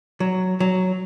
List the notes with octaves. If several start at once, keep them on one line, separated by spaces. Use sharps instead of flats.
F#3
F#3